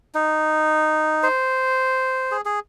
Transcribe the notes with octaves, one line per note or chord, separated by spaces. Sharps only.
D#4
C5
G#4
G#4